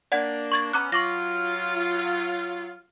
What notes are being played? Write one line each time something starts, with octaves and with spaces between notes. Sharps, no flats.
A#3 D4 D5 F#5 G#6
C#6 G#6 A6
B3 C#4 A#5 D6 F#6
F#3 F4 C#6 D6 A#6